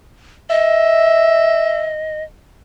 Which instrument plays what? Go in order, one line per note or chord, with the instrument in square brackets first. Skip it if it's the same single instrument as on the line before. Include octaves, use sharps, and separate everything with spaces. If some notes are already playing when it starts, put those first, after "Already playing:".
[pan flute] D#5 [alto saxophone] E5